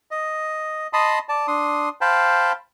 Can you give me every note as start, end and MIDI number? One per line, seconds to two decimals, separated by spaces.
0.11 0.87 75
0.93 1.19 75
0.93 1.19 81
0.93 1.19 83
0.93 1.19 84
0.93 1.19 87
1.29 1.47 74
1.29 1.47 81
1.48 1.89 62
1.48 1.89 84
1.48 1.89 87
2.01 2.52 72
2.01 2.52 77
2.01 2.52 79
2.01 2.52 81
2.01 2.52 83